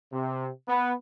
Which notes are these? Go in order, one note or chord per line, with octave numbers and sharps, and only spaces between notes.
C3
B3